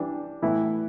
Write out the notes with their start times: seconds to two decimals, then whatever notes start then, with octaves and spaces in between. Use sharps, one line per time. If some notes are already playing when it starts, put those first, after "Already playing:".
Already playing: E3 G3 D4
0.42 A2 E3 B3 E4